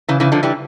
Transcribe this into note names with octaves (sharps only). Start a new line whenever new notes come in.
C#3 E3
C#3 E3
D3 F3
E3 G3